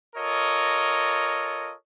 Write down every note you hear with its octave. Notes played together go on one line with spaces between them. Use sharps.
F4 A4 A#4 C#5 D#5